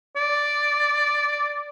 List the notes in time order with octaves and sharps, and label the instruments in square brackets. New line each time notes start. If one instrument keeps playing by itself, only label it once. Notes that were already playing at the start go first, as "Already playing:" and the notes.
[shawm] D5